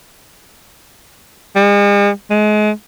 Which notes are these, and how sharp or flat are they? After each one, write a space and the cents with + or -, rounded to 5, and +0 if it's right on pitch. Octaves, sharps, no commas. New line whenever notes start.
G#3 -45
G#3 +30